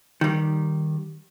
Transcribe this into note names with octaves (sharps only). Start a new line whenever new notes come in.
D#3 G3